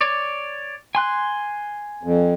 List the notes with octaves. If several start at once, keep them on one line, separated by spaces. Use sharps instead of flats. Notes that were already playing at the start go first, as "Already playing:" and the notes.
C#5 D5
G#5 C6 F#6
F2